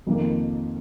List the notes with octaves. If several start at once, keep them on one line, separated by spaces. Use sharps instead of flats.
F2 D#3 A#3